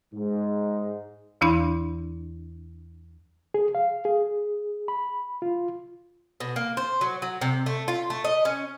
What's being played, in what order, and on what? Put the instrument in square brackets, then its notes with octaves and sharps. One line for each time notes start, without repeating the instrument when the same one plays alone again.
[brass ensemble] G#2
[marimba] E2 E3 D4 E4 B5
[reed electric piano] G#4
F5
G#4
B5
F4
[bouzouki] B2
A#3
C5
F#3
F#3
C3
A3
F4
A3
D#5
C#4